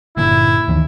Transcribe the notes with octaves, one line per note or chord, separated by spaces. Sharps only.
G1 A#2 D3 E4
D2 D#3 E3